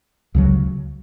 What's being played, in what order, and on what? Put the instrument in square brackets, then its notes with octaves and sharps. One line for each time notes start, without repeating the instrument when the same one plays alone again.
[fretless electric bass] C#2 C#3 F#3